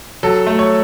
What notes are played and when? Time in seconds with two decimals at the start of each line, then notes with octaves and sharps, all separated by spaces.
0.23 F#3 A4
0.47 A3
0.59 C#5